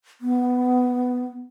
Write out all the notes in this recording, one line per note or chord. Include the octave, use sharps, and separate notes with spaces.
B3